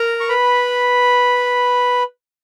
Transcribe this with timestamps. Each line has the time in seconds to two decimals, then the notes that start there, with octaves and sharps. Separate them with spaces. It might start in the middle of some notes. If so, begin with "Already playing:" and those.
Already playing: A#4 A#5
0.20 C#6
0.29 B4 B5